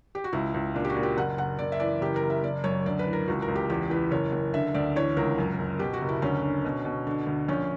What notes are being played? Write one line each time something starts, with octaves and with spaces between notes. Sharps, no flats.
G4
F#4
C#2 E4
C#2
A#2 D4
G4
F#4
A#2
G4
F#1 F#5
F#1 F#5
F#1 D5
E5
E3 D5
F#1 G4
A#4
F#1
E5
F#1 D5
F#2 C#5
D2 D5
B4
E3
A#4
C#2 F#4
A#4
C#2
G4
E2 G4
E3 B4
F#1 C#5
F#1
D3 E5
D2 D5
E3 C#5
C#2 A#4
F#2
F#1
B2 G4
F#4
F#1
E4
D2 C#4
D3
B2
B2
D3
D2
A#1 C#4